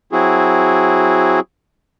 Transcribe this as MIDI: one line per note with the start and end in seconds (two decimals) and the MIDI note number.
0.12 1.40 54
0.12 1.40 60
0.12 1.40 64
0.12 1.40 66
0.12 1.40 68